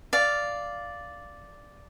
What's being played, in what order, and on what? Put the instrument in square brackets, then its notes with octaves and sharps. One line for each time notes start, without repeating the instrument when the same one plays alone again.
[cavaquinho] D5 F5